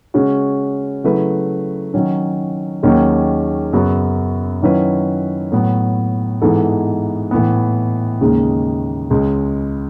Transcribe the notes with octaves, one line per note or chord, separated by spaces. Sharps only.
C#3 G#3 C#4 F#4
C#3 F#3 A3 E4 B4
D#3 F#3 C#4
D#2 D#3 F#3 C#4 G#4
F#2 C#3 F#3 B3 F#4
D#3 F#3 C#4 E4 B4
A2 F#3 B3
G#2 E3 B3 D#4 A4
A2 E3 B3
D#2 C#3 G#3 D#4
C#2 C#3 G#3